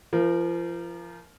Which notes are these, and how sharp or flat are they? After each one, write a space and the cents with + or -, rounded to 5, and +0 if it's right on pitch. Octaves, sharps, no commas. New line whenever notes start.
F3 -30 A#4 +0